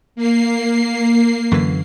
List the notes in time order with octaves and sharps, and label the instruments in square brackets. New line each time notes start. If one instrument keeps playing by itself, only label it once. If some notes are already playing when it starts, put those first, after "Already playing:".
[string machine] A#3 C7
[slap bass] F#2 D3 E3